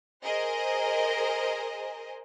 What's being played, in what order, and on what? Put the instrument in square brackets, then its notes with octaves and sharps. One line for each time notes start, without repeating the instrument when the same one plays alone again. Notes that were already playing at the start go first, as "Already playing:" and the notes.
[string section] G#4 A#4 C5 D#5